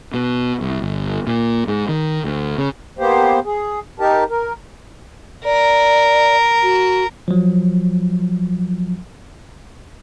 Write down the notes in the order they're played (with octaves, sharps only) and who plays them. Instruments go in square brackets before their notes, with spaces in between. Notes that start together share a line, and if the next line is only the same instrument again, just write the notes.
[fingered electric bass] B2
C2
G1
A#2
G#2
D#3
D2
C#3
[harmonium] A#3 B3 G4 C5
G#4
D#4 G4 A#4 A5
A#4
[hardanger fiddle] A#4 [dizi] D5
[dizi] F#4
[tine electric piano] F3 F#3